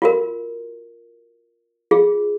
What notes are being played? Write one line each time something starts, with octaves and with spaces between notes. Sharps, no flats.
F4 F#4 A#4
F4 G#4